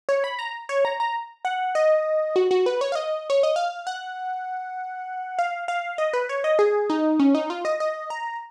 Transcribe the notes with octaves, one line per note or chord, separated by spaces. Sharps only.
C#5
B5
A#5
C#5
A#5
A#5
F#5
D#5
F#4
F#4
B4
C#5
F5
D#5
C#5
D#5
F5
F#5
F5
F5
D#5
B4
C#5
D#5
G#4
D#4
C#4
D#4
F4
D#5
D#5
A#5